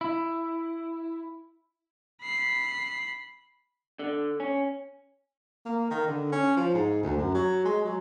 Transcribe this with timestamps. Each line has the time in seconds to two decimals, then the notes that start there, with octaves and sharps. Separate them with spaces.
0.01 E4
2.22 B5 C7
3.99 D3
4.40 C#4
5.65 A#3
5.90 D#3
6.07 D3
6.32 C#4
6.57 F3
6.74 G#2
7.03 D2
7.17 F#2
7.34 F#3
7.65 G#3
7.85 F#3